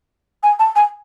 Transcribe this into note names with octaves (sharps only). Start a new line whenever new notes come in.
G#5
A5
G#5